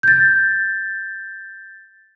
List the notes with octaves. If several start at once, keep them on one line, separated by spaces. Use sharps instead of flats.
G6 A6